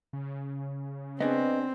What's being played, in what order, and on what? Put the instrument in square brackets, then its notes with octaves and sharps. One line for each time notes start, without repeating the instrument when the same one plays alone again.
[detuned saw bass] C#3
[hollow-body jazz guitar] B3 D4 G#4 [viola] C4 [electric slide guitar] B4 D#5